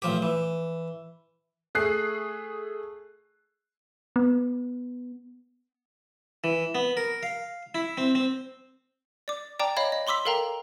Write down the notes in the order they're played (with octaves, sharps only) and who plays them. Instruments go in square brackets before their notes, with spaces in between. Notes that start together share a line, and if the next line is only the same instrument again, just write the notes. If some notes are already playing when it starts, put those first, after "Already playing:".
[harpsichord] A1 F3 G4
E3
[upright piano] A3 G#4 F#6 C7
[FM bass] B3
[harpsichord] E3
B3
A#4
F5
E4
C4
C4
[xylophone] D5 D6
D5 G5 A5 A#5 D6
C#5 D#5 F5 B5 G#6
D#5
B5 C6 D6 E6 B6
A4 A#4 F5 G5 A#5